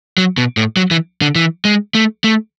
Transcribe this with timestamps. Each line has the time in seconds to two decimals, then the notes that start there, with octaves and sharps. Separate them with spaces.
0.18 F#3
0.38 B2
0.57 A2
0.76 F#3
0.91 E3
1.21 D3
1.35 E3
1.65 G#3
1.95 A3
2.24 A3